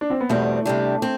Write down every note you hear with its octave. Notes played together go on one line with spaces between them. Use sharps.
D4
C4
B3
E2 B2 G3 A3 C4
C3 G3 D4
C4